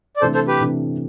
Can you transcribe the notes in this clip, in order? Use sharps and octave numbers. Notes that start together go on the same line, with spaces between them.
D5
C3 E3 A3 D4 A4 C5
A4 C5
G4 B4
C3 E3 A3 D4